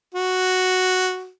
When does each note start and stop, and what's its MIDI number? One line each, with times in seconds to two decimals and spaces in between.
0.14 1.29 66